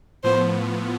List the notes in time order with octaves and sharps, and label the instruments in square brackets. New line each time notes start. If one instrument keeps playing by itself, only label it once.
[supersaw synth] A2 F3 B3 [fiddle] C5